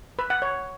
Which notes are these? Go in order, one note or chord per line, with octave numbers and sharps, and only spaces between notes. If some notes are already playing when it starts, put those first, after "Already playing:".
B4
F#5
C#5